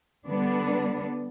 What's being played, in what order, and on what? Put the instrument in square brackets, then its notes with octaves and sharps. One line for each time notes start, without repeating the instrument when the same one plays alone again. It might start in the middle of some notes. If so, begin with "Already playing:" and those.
[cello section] D3 G3 B3 D4